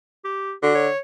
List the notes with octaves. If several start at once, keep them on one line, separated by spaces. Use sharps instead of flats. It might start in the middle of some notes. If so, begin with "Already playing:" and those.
G4
D3 F#4
C#5